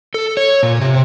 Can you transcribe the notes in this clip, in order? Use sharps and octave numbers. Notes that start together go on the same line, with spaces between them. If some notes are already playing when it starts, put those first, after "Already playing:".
A4
C#5
A#2
C3